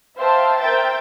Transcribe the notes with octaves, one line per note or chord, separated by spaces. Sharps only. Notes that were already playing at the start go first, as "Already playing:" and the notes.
C5 E5 F5 G5 A5
A#4 C5 E5 G5 G6 A6